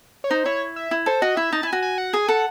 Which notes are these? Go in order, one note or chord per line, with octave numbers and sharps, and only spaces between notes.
C#5
D#4 C5
E4 C#5
E5
E4
A4 C5
F#4 D#5
E4 E5
D#4 A5
E4 G#5
F#4
G#5
F#5
G#4 G#5
A4 F#5